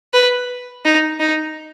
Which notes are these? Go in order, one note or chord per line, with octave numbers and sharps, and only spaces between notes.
B4
D#4
D#4